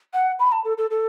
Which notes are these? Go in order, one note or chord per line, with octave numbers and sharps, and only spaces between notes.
F#5
B5
A5
A4
A4
A4